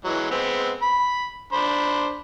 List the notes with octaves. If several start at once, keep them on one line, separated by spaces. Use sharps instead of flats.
E3 F#3 G#3
G#3 B3 C4
B5
D4 C5 B5